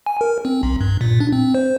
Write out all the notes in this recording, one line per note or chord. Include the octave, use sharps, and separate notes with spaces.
G#5
A#4
C4
B1
G2
A#2
D4
C4
C5